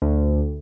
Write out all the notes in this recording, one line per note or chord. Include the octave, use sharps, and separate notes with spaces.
D2